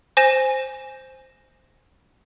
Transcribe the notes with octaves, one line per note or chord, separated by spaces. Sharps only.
C5 G#5 A#6 E7